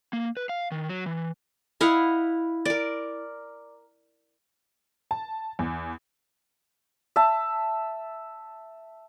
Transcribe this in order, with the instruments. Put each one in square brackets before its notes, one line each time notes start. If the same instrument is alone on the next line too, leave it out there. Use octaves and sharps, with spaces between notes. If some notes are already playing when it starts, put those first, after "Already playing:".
[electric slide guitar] A#3
B4
F5
D#3
F#3
E3
[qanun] E4 D#5 F5 F#5
A#4 D5
[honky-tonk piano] A5
E2
[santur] E5 A5